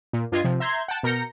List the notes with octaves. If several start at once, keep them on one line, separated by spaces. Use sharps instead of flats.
A#2
G2 F4 D#5 G#6 C7
C3 F3
E5 A#5 C6 G6 G#6
F#5 G5 A5
B2 A#4 A#5 G6 A#6 C#7